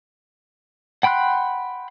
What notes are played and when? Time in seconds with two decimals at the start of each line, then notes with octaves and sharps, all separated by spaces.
1.03 F#5 G5 B5 C6 F#6